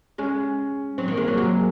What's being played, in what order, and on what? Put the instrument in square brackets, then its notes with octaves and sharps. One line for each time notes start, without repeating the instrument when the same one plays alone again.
[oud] G#3 [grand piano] C#4
[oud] F#3 [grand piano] C4
[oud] D#3 [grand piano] A#3
[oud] G#3
[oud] F#3 [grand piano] A#3
[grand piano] F#3 [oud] G#3